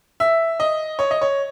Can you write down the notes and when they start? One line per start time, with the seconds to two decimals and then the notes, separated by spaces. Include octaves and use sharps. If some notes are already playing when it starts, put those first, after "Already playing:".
0.20 E5
0.60 D#5
0.99 C#5
1.11 D#5
1.21 C#5